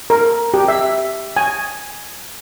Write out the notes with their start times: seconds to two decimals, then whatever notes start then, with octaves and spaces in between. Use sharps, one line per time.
0.10 A#4
0.54 G4
0.68 E5
1.37 G#5